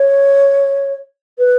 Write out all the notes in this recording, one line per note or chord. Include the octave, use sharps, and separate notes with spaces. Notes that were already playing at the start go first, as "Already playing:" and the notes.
Already playing: C#5
B4